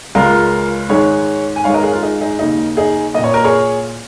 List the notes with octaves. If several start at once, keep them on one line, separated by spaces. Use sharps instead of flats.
C#2 C#3 G#3 F4 A#4
G#2 D#3 G#3 G#4 C#5
G#5
G#2 D#3 G#3 C#5 F5
A#4 D#5
G#4 C#5
F4 A#4
D#4 G#4
D#4 G#4
D#2 C#3 A#3 D#4
D#4 G#4
A#2 A#3 D#5
C#5
A#4
G#4 C#5